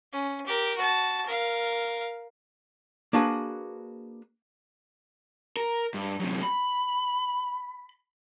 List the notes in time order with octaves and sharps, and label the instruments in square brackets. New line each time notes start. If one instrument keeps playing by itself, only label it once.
[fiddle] C#4
G4 A#4
F#4 A5
A#4 F5
[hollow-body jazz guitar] A#3 D4 F#4 G#4 B4
[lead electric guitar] A#4
G2
F#2 C3
B5